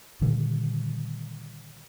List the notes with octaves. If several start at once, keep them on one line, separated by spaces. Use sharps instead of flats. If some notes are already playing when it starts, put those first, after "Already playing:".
A#2 D3 D#3 G3